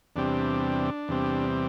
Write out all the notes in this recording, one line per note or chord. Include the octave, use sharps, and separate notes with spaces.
E2 C3 G3 C4 D4
E2 C3 G3 C4